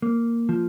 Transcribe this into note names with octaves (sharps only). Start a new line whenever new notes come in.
A#3
F3